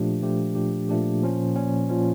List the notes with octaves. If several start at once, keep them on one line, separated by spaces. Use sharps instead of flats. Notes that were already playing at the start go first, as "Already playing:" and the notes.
Already playing: A#2 F3 A3 D4 G4
A#2 F3 A3 D4 G4
A#2 F3 A3 D4 G4
A#2 F3 A3 D4 G4
A#2 F3 C#4
A#2 F3 C#4
A#2 F3 C#4